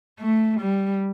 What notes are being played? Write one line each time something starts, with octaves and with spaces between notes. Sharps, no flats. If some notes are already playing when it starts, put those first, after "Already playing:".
A3
G3